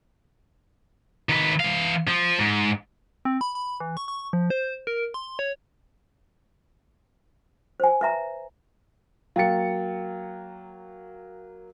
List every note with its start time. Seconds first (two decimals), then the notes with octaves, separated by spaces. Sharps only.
1.29 D#3 B4
1.60 E3 F5
2.08 F3
2.39 G#2
3.25 C4
3.41 B5
3.55 B5
3.80 E3
3.97 C#6
4.08 C#6
4.33 F3
4.50 C5
4.87 A#4
5.14 C6
5.39 C#5
7.80 C5 G#5
8.01 B4 E5 A#5
9.36 F#3 A#3 F5 G5 A6 C#7